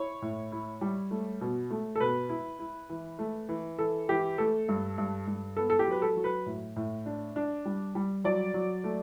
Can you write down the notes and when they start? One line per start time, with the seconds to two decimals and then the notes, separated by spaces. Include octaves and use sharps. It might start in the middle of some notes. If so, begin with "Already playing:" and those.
Already playing: E4 C#5
0.22 A2
0.52 E4
0.81 G3
1.11 A3
1.41 B2
1.71 A3
1.95 A4
2.00 B2 B4
2.29 E4
2.59 E4
2.90 E3
3.19 A3
3.49 E3
3.79 E3 A4
4.09 E3 G4
4.38 A3 A4
4.68 G2
4.98 G2
5.27 G2
5.56 B3 A4
5.70 A4
5.79 G4
5.87 F#3 B4
6.02 A4
6.16 F#3
6.24 B4
6.46 A2
6.76 A2
7.06 D4
7.36 D4
7.65 G3
7.95 G3
8.24 F#3 D5
8.54 F#3
8.84 A3